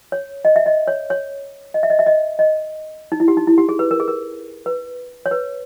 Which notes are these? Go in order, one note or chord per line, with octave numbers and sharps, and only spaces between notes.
C#5
D#5
E5
D#5
C#5
C#5
D#5
E5
D#5
E5
D#5
D#5
D#4
E4
G4
D#4
E4
G4
G#4
B4
A#4
G#4
A#4
B4
C#5
B4